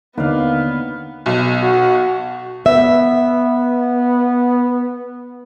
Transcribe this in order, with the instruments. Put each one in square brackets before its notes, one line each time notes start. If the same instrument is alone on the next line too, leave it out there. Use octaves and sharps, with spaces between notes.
[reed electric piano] D#2 D3 [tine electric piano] A#3 D#4 [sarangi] B3 [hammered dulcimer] B4 D5 F5
[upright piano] B1
[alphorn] F#4
[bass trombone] B3 [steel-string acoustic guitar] E5